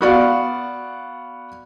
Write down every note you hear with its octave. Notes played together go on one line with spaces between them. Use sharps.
B3 F#4 D5 F5